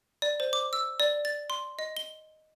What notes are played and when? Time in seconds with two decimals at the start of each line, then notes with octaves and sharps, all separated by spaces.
0.22 D5
0.40 C5
0.53 D6
0.73 E6
1.00 D5
1.25 A6
1.50 C6
1.79 D#5
1.97 G7